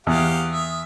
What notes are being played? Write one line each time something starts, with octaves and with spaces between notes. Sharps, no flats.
E2 G4 F5 F#5 D#6
E5